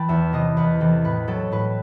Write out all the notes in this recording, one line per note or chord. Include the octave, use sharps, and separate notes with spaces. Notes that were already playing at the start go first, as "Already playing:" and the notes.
Already playing: E3 G5 A5 B5
E2 E5
C3 E3 D#5
E2 B4
C3 E3 A4
A2 B4
F#3 A4
A2 B4